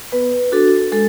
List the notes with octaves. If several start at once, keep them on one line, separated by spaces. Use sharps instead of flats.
B3 B4
D4 F#4 A4
G#3 A4